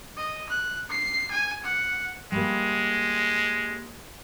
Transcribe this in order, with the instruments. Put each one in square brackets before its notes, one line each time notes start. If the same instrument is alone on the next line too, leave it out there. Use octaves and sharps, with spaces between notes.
[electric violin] D#5
F#6
C7
G#5
F#5
[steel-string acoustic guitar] G3 A#3 [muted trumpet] G#3